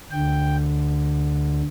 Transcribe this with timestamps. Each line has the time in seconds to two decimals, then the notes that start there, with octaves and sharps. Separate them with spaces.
0.11 D2 D3 G5